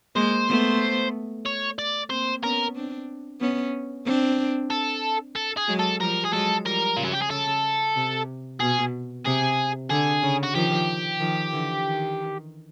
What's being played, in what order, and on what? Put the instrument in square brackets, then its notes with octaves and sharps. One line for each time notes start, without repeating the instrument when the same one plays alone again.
[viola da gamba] G#3 A#3 [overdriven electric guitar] C5
[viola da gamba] A3 B3
[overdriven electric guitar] C#5
D5
[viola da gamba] A#3 C4 [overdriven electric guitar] C5
[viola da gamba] B3 C#4 [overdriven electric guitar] A#4
[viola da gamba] C4 D4
B3 C#4
C4 D4
[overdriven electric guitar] A4
A4
G#4
[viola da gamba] F#3 G#3
[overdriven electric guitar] A4
[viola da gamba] F3 G3 [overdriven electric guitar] A#4
[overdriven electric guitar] G#4
[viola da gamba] F#3 G#3 [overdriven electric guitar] A4
[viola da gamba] F3 G3 [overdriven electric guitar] A#4
[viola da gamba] C#3 [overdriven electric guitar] F4
[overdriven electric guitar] F#4
G4
G#4
[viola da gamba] C#3 [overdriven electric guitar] A4
[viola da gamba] C3
[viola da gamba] B2 [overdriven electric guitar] G#4
[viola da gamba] C3 [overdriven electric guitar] G#4
[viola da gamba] D3 [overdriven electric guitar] G#4
[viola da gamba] C#3
[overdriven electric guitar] F#4
[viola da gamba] D#3 F3 [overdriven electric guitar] G4
[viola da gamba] D#3 F3
D3 E3
D#3